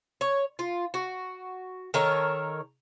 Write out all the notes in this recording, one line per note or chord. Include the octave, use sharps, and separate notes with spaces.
C#5
F4
F#4
D#3 A4 A#4 C#5